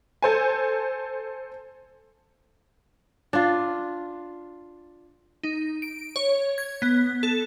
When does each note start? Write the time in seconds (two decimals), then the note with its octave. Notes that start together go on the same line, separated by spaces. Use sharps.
0.22 A4 C5 G#5
3.33 D4 F4
5.43 D#4
5.82 D7
6.16 C#5
6.58 G#6
6.82 B3
7.23 A4